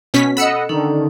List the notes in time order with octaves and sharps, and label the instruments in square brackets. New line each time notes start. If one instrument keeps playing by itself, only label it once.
[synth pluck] B2 C#4 B6
[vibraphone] A4 [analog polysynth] D#5 F#5 [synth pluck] B5 E6 C#7
[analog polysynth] D3 D#3 [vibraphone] C#4 D#4 A4